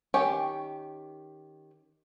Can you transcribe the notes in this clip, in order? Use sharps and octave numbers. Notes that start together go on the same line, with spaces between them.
D#3 C#4 G4 C#5